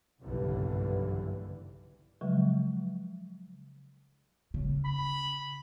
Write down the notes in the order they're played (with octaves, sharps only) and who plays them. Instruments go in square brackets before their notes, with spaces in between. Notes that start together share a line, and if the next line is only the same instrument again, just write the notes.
[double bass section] F#1 B1 G2 D3 E3
[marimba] C#3 F3 F#3 G#3
[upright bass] C#3
[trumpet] B5